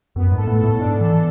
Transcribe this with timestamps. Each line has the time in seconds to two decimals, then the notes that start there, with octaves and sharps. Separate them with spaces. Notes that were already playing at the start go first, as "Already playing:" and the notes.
0.16 F#2 B3
0.31 G#2
0.37 A4
0.47 A2
0.57 A4
0.64 A2
0.79 G#2 D4
1.00 E3 A4